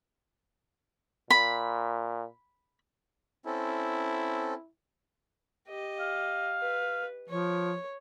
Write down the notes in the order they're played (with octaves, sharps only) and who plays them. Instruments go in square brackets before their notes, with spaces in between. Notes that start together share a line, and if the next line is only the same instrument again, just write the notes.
[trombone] A#2 [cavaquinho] B5
[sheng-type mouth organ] C4 C#4 A4 [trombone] E4
[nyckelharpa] G4 D#5
[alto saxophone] F5
[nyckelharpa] B4
[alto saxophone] F3 [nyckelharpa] C#5